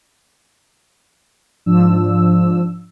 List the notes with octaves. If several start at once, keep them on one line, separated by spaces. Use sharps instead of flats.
G#2 F3 D4 E6